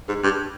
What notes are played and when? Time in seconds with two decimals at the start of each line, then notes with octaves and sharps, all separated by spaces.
0.09 G#2
0.24 G2